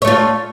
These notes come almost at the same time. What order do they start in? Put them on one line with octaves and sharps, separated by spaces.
C#5 A3 F4